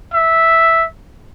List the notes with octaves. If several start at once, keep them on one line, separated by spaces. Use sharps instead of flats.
E5